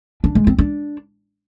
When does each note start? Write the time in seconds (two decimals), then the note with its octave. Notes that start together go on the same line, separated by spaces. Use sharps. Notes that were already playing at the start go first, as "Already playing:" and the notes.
0.24 D4
0.35 G#3
0.47 C4
0.58 D4